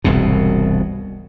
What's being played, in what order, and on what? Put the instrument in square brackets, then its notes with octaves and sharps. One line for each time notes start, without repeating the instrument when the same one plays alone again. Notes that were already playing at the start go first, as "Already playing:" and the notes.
[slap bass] E1 C2 G#2 B2